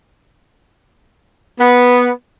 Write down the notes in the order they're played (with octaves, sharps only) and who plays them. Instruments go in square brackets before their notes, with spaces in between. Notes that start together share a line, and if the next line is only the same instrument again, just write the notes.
[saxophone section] B3